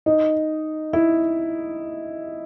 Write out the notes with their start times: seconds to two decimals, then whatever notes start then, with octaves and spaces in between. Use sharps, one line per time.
0.06 D#4
0.93 E4